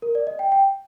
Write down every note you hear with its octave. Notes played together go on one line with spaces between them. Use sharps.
A#4
D5
D#5
G5
G5